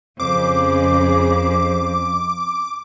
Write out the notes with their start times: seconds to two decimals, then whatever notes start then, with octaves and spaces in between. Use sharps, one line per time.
0.20 F2 C#3 G#4 C5 D6